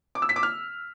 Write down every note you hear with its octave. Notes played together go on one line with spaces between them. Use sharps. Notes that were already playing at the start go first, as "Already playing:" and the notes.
D6
E6
B6
D6
F6